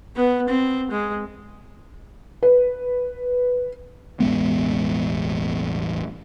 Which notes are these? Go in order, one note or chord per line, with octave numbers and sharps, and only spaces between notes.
B3
C4
G#3
B4
E1 A1 G#3 B3